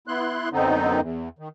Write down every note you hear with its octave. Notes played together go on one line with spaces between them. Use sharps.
B3 E4 C6 F#6
F#2 D3 B3 C4 D#4
E2
D#3